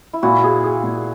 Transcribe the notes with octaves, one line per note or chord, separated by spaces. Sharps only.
E4
A#2 F#4
G#4
G#4
A#2